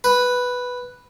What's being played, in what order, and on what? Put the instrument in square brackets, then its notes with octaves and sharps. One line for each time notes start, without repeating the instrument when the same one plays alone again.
[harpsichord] B4